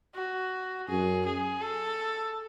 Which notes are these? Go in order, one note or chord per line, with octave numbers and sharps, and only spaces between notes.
F#4
F#2 G#4
G#4
A4